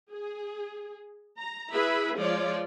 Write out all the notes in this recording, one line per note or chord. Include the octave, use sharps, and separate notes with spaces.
G#4
A#5
E4 G#4 B4 E5 B5
F3 G#3 F4 C#5 D5